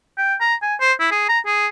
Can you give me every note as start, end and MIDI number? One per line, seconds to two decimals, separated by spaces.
0.18 0.35 79
0.41 0.55 82
0.62 0.75 80
0.80 0.93 72
1.00 1.09 64
1.11 1.28 68
1.29 1.39 82
1.46 1.67 68